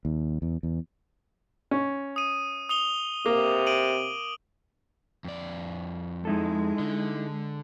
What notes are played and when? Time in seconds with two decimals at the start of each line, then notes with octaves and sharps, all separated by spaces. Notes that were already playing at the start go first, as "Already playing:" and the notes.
0.05 D#2
0.42 E2
0.63 E2
1.71 C#4
2.16 D#6 D#7
2.69 D#6 F7 G7
3.26 C3 A#3 D6
3.67 D7 D#7 F#7
5.24 F2 D5
6.25 G#3 D#4 E4 A4
6.79 D3